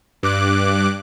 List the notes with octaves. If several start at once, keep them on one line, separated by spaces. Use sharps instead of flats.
G2 D6 F#6